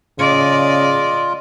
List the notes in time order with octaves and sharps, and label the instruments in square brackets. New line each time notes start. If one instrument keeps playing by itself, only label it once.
[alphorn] C#3 [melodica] F4 [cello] D5 D#5